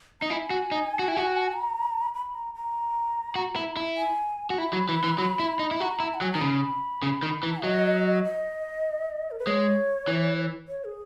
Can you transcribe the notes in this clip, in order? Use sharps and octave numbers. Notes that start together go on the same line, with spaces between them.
D#4 A#5
E4 G#5
F#4
D#4
F#4
E4
F#4
A#5
B5
A#5
A#5
F#4
E4
E4
G#5
F#4
E4 B5
F#3
E3
E3
F#3
E4
D#4
E4
F#4 A#5
E4
F#5
F#3 G#5
D#3 A#5
C#3 B5
C#3
D#3
E3
F#3 D#5
D#5
A#4
B4
G#3 C#5
E3
C#5
G#4